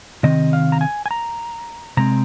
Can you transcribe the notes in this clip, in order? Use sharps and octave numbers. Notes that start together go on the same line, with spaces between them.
C3 D#3 C4 D#5
F5
A#5
G#5
G#5
A#5
C3 G#3 C4 A#5